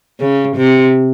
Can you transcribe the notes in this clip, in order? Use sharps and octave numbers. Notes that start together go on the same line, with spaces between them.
C#3
C3